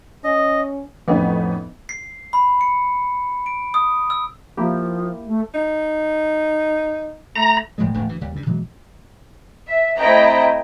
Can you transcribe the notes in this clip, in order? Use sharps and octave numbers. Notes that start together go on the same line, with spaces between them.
C#4 D#5
F2 A2 B3 C#4 D#4
C7
B5
C#7
D7
D#6
E6
F3 A#3 E4 G4
A3
D#4
A3 A#5
E1 A2 F3 G#3
E1 D2 A2 D3
D2 E3
D#2 C3 G3
G2 C#3
B2 E3 F#3 G#3
E5
A3 C4 E4 D#5 G5 A#5